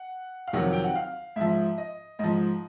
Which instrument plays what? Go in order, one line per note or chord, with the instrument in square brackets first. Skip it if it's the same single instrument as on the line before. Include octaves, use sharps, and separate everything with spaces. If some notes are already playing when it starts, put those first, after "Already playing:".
Already playing: [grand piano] F#5
F5
F2 C3 D#3 F#3 F#5
G5
F#5
F5
G#2 F3 E5
D#5
G#2 F3 D#5